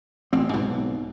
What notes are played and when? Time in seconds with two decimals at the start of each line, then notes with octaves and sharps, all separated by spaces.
0.33 A1 C4
0.54 B1 G#2 B2